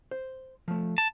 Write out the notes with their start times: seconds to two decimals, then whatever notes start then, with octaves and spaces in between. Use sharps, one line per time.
0.11 C5
0.68 F3 A3
0.98 A5